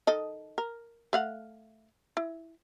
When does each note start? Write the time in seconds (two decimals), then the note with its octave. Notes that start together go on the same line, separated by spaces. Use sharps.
0.07 D#3 A4 D#5
0.58 A#4
1.13 A3 F5 F#5
2.17 E4